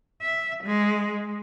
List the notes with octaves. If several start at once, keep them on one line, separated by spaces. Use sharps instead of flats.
E5
G#3